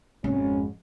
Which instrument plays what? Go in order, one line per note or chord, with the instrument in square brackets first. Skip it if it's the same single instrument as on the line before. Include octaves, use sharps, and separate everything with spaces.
[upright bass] G#1 F2 [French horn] C#4